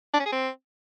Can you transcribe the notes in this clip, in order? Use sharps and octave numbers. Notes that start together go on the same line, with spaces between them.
D4
C#4
G#4
C4